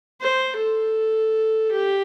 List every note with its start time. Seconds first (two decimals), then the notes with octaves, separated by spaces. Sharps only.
0.21 C5
0.57 A4
1.71 G4